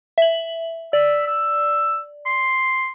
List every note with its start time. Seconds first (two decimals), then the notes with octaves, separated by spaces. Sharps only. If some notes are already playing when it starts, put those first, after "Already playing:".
0.18 E5 F#7
0.93 D5 E5
1.27 E6
2.26 C6